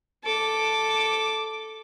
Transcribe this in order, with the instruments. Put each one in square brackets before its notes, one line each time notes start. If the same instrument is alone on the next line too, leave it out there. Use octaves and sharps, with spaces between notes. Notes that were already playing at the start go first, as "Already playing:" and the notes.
[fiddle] A4 D6